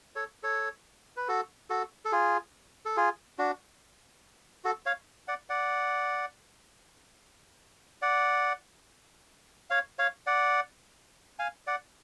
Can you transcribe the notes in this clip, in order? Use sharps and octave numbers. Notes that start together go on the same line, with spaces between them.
A4 C#5
A4 C#5
B4
F#4 A4
F#4 A4
A4
F4 G#4
A4
F4 G#4
D4 F#4
F#4 A4
C#5 F5
D5 F#5
D5 F#5
D5 F#5
C#5 F5
C#5 F5
D5 F#5
F5 G#5
D5 F#5